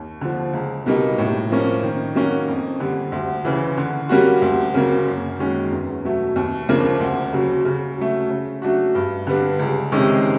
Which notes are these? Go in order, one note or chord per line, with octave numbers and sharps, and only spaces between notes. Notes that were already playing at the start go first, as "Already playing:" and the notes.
Already playing: D#2
D3 F3
C#2
B2 G3 A#3 D#4
A2
F3 A#3 C#4
D#3
F#3 A#3 C#4 F#4
F2
D3 G3
D2
C#3 E3
D3
G3 A#3 C#4 F#4
D2
C#3 F#3 A#3
F#2
D#3 G#3 C#4 F#4
E2
B2 F#3 A3
D#2
C#3 F3 A#3 D4
D2
C#3 F#3
C#3
F#3 A3
C#3
F#3 A3 D4 F#4
G2
D3 G3 B3 D4
C#2
C3 D#3 G#3 C#4